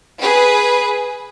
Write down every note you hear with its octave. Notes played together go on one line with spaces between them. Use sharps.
G#4 B4